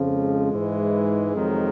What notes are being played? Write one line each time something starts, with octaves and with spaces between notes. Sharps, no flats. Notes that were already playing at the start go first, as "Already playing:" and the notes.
Already playing: F2 C#3 F3
G#3
G#2 E3
F2 C3 D#3 F#3